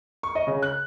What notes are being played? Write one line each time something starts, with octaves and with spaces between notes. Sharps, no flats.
C#6
D#5
C#3
F#6